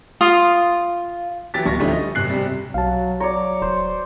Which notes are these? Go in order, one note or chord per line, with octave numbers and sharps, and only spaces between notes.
F4 F5 D#6
E3 F#3 G4 A6 B6
D1 C#6 A#6
D3 F3 G3 A3 C#4 D#4
D#5
F#2 C3 F#6 C7
C3 G3
B1 F#3 F5 A5
F#3 C#5 D5 A#5
D#1 C5